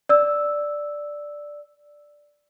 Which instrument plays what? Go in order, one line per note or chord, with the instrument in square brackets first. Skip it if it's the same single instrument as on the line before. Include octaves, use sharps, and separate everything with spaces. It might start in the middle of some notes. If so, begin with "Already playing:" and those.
[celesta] D5 E6